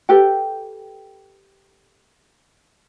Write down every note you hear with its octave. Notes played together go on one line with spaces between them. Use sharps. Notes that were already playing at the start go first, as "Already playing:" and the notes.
G4 A4 B4 G5